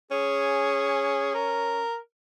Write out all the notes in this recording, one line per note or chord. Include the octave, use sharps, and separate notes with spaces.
C#4 G#4
A#4